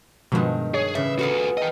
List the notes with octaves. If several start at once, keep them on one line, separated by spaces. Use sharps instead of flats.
G2 B2 D#3 F3 G#3
G#4 C#5
A2 C#3 E3 E5
B3 F4 F#4 G#4 A4
A4 D#5 G5